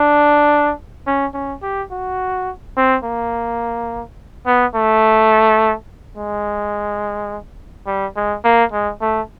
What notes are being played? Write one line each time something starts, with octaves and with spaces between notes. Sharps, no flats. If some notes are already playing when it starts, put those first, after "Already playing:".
Already playing: D4
C#4
C#4
G4
F#4
C4
A#3
B3
A3
G#3
G3
G#3
A#3
G#3
A3